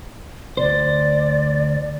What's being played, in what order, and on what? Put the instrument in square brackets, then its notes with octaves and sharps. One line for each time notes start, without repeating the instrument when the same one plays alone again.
[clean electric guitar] D2 B2 C5 [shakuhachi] D5